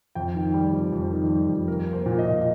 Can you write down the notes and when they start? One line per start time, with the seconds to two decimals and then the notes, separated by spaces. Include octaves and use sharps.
0.15 F2 G5
0.35 D#3
0.54 G3
0.73 F2
0.92 F2
1.11 D#3
1.30 G3
1.49 F2
1.68 A#3 A#4
1.87 A#3
1.93 C5
2.06 A#2
2.19 D#5
2.25 A#2